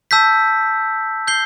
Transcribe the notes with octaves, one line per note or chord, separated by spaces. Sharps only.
A5 E6 G6 B6
G6 C7 G7